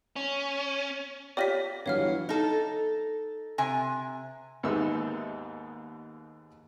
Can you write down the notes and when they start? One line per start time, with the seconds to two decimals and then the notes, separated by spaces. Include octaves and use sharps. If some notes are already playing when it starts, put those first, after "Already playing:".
0.16 C#4
1.37 F4 G4 C#5 D5 A#6 B6
1.86 G1 E3 F#3 C#5 F5 F6
2.29 D#4 A4
3.58 C3 G#5
4.63 D#2 G#2 B3 D#4 E5 E6